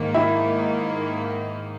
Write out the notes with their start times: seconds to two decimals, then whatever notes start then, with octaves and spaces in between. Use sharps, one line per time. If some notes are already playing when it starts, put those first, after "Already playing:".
Already playing: G#2 D#3 A#3
0.14 E4